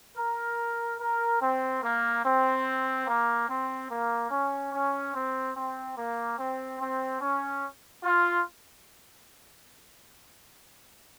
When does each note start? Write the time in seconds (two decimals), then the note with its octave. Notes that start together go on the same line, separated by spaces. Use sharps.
0.17 A#4
1.00 A#4
1.41 C4
1.83 A#3
2.24 C4
3.07 A#3
3.49 C4
3.90 A#3
4.31 C#4
4.73 C#4
5.14 C4
5.56 C4
5.97 A#3
6.38 C4
6.80 C4
7.21 C#4
8.04 F4